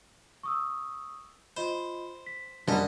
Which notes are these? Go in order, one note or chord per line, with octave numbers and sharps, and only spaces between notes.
C#6 D#6 E6
F4 C5 D#5 B5
B6
F#2 D3 G3 D5 D#5 G#5 A#5